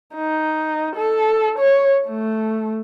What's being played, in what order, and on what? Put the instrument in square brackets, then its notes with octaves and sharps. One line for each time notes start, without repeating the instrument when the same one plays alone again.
[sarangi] D#4
A4
C#5
A3